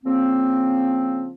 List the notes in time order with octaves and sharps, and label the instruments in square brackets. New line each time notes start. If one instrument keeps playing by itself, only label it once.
[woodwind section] C#3 F3 A#3 C4